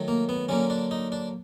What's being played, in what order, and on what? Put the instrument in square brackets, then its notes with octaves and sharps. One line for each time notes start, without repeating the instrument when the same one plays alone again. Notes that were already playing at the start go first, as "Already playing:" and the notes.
Already playing: [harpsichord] D#3 F#3 A3
A#3
B3
D3 F#3 A#3 C#4
D4
D#4
D4